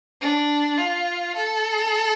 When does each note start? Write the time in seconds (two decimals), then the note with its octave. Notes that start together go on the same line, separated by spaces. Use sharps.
0.21 D4
0.78 F4
1.36 A4